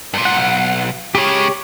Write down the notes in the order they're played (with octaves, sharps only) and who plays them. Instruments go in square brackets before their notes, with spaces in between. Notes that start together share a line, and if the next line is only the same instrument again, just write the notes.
[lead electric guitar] G2 A#2
[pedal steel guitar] F#5
[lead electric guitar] B1
[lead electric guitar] C#3 G#3 [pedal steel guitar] G4 C#5